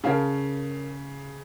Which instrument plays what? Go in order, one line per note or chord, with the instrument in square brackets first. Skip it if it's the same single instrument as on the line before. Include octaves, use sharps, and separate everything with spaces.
[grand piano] C#3 [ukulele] A#4 C#5 F5 A5